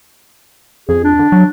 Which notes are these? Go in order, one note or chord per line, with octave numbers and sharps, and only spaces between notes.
F2 G#4
D4
D3
F#3